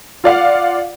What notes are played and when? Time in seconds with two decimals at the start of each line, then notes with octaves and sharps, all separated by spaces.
0.24 F4 D5 F5 F#5